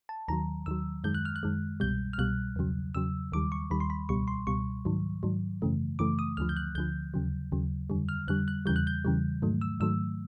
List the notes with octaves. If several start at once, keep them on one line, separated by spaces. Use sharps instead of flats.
A5
D#2 D#3 F#3 A#5
D#2 D#3 F#3 E6
F#2 D#3 G#3 G6
F#6
F6
F#6
F#2 D#3 G#3
C2 B2 G3 G6
F6
C2 B2 G3 F#6
E2 C#3 F#3
E2 C#3 F#3 E6
D#2 D#3 G3 D6
C#6
D#2 D#3 G3 B5
C6
B5
C#2 B2 G3 C#6
C6
C#2 B2 G3 C#6
G#2 D#3 F#3
G#2 D#3 F#3
F#2 C#3 E3 A3
F#2 C#3 E3 A3 D6
D#6
D2 D3 F3 F6
G6
F#6
D2 D3 F3 G6
D#2 C#3 F#3
D#2 C#3 F#3
F2 D3 G3
F6
F2 D3 G3 F#6
F#6
E2 C#3 E3 G3 G6
F#6
G6
E2 C#3 E3 G3
G#2 D#3 F#3 A3
E6
G#2 D#3 F#3 A3 E6